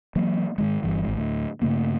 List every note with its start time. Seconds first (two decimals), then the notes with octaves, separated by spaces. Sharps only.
0.16 E3 F#3 A#3
0.58 G#2 D#3 G#3
0.83 G1 G2 E3 G3
1.04 G#1 G#2
1.17 D2 A2
1.62 G2 C#3 A3 A#3